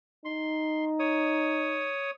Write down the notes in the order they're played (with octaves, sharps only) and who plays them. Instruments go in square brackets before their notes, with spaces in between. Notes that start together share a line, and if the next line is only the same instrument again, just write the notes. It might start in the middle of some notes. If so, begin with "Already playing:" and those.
[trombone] D#4 [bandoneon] C6
[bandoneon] C#5 D#6